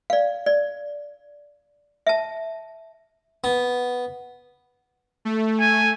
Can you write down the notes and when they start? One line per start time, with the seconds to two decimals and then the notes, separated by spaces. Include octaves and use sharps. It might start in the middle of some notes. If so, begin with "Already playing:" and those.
0.10 D5 F5
0.46 D5
2.07 E5 A5
3.44 B3
5.25 A3
5.60 G#5